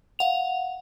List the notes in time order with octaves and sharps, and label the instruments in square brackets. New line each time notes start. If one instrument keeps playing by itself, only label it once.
[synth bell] F5 F#5 F7